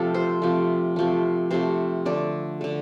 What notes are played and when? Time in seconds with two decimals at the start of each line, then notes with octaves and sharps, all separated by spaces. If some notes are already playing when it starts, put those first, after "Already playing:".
Already playing: C3 F3 A3 A4
0.15 C5
0.42 C3 F3 A3
0.96 C3 F3 A3
1.51 C3 F3 A3 C5
2.06 D3 A3 D5
2.61 D3 A3